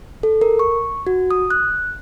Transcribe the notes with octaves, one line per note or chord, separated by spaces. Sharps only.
A4
A#4
C#6
F#4
D#6
F#6